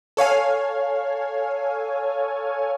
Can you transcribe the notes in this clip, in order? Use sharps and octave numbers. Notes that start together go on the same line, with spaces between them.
A4 C#5 F5 G#5